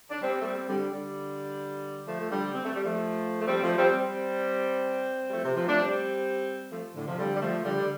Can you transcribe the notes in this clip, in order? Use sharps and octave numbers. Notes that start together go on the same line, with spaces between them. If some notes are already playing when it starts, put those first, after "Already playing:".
D4
G3 C4
A3
G3 C4
D3 G3
D3 G3
F3 A3
A3
D3 G3
C4
A3
G3
F3 A3
A3
G3 C4
F3 A3
G3 C4
G3 C4
G3
F3 A3
C3
C3 F3
A3 D4
G3 C4
F3 A3
A2 D3
C3 F3
D3 G3
G3
F3 A3
D3 G3
D3